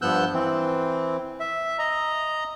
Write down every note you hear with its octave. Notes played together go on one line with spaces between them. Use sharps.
G2 F3 B3 E6 F#6 G6
E3 C4
E5
D#5 A#5